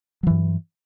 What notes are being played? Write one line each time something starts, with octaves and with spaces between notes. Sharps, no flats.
G2 E3 F#3